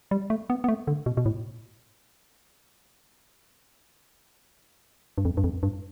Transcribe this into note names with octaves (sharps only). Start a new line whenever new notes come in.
G3
A3
B3
B3
A3
D3
B2
B2
A2
G2
F2
G2
F2
G2